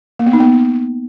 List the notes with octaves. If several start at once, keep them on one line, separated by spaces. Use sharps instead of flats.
A#3
B3
D#4
B3